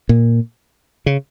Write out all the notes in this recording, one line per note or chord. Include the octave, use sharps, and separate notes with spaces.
A#2
C#3